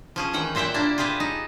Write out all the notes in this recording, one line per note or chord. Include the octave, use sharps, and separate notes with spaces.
F3 C#4 G#4
D#3 E3 F#5 G5
A#2 C5 E5 F#5 G5
A#3 D4 E4 G4
F4 G4 G#4 B4 C5
D#4